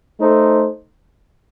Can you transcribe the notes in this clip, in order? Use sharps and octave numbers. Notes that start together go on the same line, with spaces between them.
A3 D#4 A4 C5